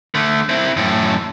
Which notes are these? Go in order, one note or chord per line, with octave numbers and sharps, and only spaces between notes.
D3 A3
C4 E4
F#2 A2